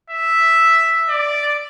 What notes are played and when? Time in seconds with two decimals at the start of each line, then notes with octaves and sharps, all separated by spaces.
0.10 E5
1.09 D5